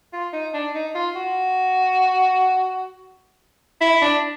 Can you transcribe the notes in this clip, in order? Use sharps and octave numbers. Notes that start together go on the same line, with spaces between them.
F4
D#4
D4
D#4
F4
F#4
E4
D4